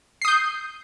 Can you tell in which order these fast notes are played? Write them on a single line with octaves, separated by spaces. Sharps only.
C7 D#6 G6